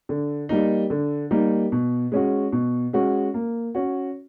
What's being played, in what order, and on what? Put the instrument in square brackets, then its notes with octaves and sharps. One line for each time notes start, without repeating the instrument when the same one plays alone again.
[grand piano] D3
G3 A#3 D#4
D3
G3 A#3 D#4
B2
G#3 C#4 F#4
B2
G#3 C#4 F#4
A#3
C#4 F#4